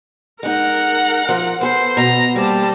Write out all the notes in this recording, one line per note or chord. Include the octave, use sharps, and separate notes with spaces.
G#3 D#4 A#4 F#5
F3
B3 G#4 A4 C5
B2 A#5
G3 A#3 C4 A5